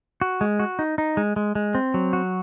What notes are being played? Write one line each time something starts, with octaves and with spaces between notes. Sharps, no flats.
F#4
G#3
F#4
D#4
D#4
G#3
G#3
G#3
C4
F#3
F#4